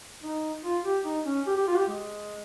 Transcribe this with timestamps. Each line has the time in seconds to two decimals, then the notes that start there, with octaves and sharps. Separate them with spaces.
0.24 D#4
0.64 F4
0.84 G4
1.05 D#4
1.26 C#4
1.47 G4
1.57 G4
1.67 F4
1.77 G4
1.88 G#3